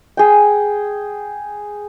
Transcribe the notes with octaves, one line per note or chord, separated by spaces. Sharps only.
G#4 G5